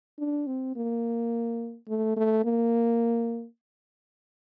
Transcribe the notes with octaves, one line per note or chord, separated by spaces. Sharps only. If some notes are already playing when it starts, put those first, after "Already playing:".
D4
C4
A#3
A3
A3
A#3